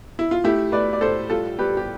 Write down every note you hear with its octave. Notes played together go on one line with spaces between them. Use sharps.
E4
F4
A3 E4 G4
A3 B4 D5
D5
A2 A4 C5
G3 F4 A4
G3 G4 B4
G4